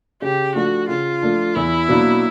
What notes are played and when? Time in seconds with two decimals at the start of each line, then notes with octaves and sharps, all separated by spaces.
0.22 C#3 G4
0.55 F3 A3 D4 F#4
0.89 C#3 F4
1.23 F3 A3 D4
1.55 E2 E4
1.89 B2 F#3 A#3 D4